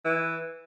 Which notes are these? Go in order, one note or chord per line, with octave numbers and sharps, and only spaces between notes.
E3